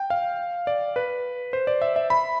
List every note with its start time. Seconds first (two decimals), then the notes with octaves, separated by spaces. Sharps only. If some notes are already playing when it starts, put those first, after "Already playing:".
Already playing: G5
0.10 F5
0.67 D5
0.96 B4
1.53 C5
1.67 D5
1.82 E5
1.96 E5
2.10 B5